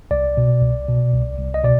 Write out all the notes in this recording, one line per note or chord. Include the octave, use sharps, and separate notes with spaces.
C2 D5
B2
C2
B2
C2
C2
D#5
B2 D5